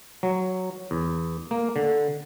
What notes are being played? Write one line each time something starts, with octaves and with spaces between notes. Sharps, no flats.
F#3
E2
A#3
D3